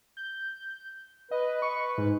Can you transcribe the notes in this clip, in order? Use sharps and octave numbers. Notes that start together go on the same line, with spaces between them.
G6
B4 D#5
C#6
G#2